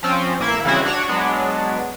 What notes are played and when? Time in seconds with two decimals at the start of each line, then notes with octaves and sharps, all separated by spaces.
0.03 F3 C4 C#4
0.39 A1 A#3 E4 E5
0.65 C#3 E3 G3 C4 E4 F#4
0.85 D4 F#4 C#5
1.08 F#3 G#3 B3 D4